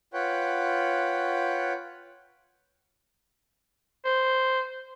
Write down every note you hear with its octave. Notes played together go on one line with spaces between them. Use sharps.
F4 B4 C#5 F#5 G5
C5